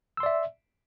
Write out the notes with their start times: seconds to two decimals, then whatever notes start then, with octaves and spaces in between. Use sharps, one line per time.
0.17 E6
0.20 C6
0.23 D5
0.26 E5